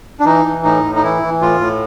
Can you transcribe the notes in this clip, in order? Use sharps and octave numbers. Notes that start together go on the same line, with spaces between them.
D4
E3 D#4
E3
A2 D#4
A2
D#4
E3 E4
E3
A2 F4
A2